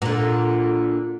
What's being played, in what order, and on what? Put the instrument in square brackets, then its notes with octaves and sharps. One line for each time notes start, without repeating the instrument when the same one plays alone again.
[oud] A#2 D3